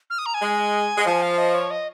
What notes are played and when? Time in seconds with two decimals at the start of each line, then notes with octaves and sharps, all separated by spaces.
0.10 F6
0.18 D#6
0.26 A#5
0.34 G#5
0.42 G#3
0.98 G#3
1.06 F3 G#5
1.22 F5
1.38 D#5
1.54 C#5
1.70 D#5